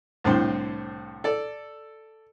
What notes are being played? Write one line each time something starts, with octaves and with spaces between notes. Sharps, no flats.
C2 A2 D3 C4 C5
A4 D5